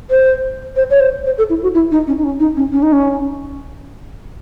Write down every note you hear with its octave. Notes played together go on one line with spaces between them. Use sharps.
C5
C5
C#5
C5
C5
A4
E4
F#4
E4
D#4
C#4
D#4
C#4
D#4
C#4
C#4
D#4
C#4